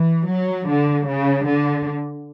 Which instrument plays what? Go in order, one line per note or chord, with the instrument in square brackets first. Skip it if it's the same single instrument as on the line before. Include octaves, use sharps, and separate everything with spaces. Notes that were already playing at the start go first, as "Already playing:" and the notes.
Already playing: [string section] E3
F#3
D3
C#3
D3